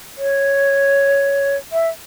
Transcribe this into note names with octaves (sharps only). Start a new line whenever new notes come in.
C#5
E5